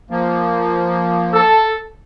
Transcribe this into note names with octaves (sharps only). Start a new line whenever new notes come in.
F3 A#3
A4